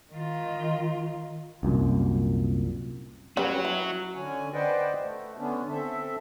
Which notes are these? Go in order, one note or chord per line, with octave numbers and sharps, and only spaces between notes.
D#3 F4
C2 F#2 A#2
F#3 C#4 F#4 G4 B4
E4
D3 C#4 G#5
B4 C5 D5 D#5 F#5 G5
A3
D3 B3 C#4 D4
C4 A4 E5